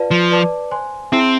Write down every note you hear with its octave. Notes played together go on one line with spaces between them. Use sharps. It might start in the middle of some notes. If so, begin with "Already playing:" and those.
Already playing: F4 B4 D5 F5 A5
F3
B4 D5 A5 D6
C5 G#5 C6
C4 E4 G#4 C5 E5 A5